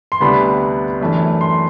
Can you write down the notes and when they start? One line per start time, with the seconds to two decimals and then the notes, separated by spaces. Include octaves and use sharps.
0.12 C6
0.20 D2 C3 G3 B3 D4 B5
1.01 F#2 E3 A3 D4
1.41 C6